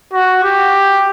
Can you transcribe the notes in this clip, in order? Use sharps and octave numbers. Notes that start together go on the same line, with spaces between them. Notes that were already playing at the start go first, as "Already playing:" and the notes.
F#4
G4